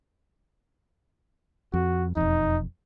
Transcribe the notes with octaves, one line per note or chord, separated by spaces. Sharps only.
F2 F#4
E1 F2 D#4